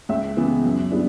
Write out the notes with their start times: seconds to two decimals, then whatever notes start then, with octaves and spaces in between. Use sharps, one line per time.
0.09 C#2 E5
0.37 C#3 E3 B3
0.64 F#2
0.91 G3 B3 D4